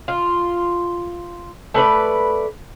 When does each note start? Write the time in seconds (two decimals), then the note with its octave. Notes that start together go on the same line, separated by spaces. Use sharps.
0.08 F4
1.74 A3 B4 C5 D5